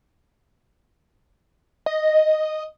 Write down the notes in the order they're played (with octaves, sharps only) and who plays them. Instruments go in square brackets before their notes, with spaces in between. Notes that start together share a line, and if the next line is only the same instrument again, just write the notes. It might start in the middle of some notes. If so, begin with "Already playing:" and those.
[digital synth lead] D#5